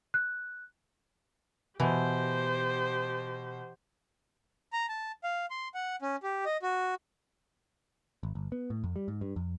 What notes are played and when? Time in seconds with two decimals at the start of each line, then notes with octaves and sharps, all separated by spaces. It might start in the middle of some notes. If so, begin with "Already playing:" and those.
0.14 F#6
1.80 B2 E3 G4 C5
4.73 A#5
4.89 A5
5.24 F5
5.50 C6
5.74 F#5
6.02 C#4
6.23 G4
6.45 D#5
6.62 F#4
8.23 G#1
8.35 G1
8.52 B3
8.70 A2
8.84 F2
8.96 G3
9.08 G#2
9.21 G2
9.36 F2